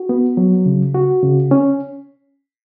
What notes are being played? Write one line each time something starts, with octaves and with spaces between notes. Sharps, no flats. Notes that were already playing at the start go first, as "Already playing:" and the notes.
Already playing: F#4
B3
F#3
C#3
F#4
C#3
C#4